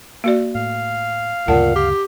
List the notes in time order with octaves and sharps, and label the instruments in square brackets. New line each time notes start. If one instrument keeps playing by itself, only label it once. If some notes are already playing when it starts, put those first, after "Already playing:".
[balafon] A#3 F#4 D5
[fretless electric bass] A2 [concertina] F5
[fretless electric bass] D2 G2 C#3 [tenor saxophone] A#2 [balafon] F#5 A5
[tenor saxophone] G4